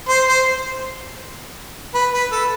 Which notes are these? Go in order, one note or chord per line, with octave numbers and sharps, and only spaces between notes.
C5
C5
B4
B4
A4